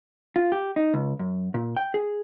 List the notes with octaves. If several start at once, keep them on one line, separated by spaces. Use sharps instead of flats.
F4
G4
D#4
C#2
F#2
A#2
G5
G#4